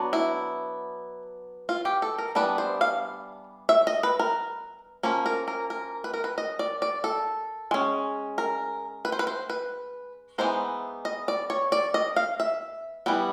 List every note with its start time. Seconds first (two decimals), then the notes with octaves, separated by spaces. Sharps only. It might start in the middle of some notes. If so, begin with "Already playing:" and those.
Already playing: F#3 B3 D4
0.13 E4
1.69 F4
1.85 G4
2.02 A4
2.18 A#4
2.35 E3 G3 B3 D4 B4
2.58 C5
2.81 F5
3.69 E5
3.87 D#5
4.03 B4
4.19 A#4
5.03 F3 A#3 C#4
5.26 A#4
5.48 A#4
5.70 A#4
6.04 B4
6.14 A#4
6.24 B4
6.38 D#5
6.59 D5
6.82 D5
7.04 A4
7.71 G#3 C#4
8.38 A#4
9.05 B4
9.12 C5
9.19 B4
9.27 C5
9.50 B4
10.38 E3 G#3 B3 D#4 C5
11.05 D#5
11.28 D5
11.50 C#5
11.72 D5
11.94 D#5
12.16 F5
12.40 E5
13.06 E3 G3 B3